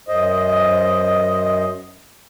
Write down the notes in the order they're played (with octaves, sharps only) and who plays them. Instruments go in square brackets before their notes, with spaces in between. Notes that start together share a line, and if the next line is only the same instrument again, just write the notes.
[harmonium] F#2 C5 D#5